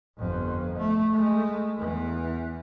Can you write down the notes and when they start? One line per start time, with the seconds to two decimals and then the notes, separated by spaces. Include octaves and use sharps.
0.18 G1 F2
0.79 A3
1.13 G#3 A3
1.77 E2 E3